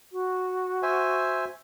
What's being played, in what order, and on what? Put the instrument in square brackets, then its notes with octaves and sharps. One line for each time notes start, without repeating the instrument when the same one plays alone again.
[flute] F#4
[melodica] C5 E5 G#5